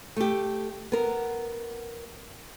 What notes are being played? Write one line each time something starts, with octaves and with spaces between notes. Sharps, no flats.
A3 G4
B3 A#4